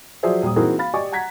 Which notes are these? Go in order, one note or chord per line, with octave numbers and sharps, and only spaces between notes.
F3 F#3 G#4 C5 D5 E5
D#1 G3 D#6
E3 A#3 C4 D#4 F#4 G#4
F5 B5 A6
G4 D5 D#5 G#5 C#6 D6
F#5 A#5 G#6 B6